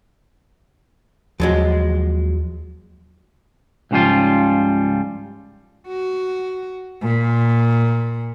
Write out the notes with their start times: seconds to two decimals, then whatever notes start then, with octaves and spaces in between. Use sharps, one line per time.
1.40 D#2 F3 F#3 G#3
3.91 C#2 G#2 C#3 F3 G3 F4
5.88 F#4
7.02 A#2